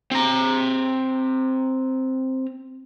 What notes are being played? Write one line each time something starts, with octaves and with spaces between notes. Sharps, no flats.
C4 A#5